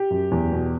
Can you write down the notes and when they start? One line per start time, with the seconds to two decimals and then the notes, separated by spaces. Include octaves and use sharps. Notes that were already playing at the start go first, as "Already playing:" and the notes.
Already playing: G4
0.10 F#2
0.31 E2
0.52 B2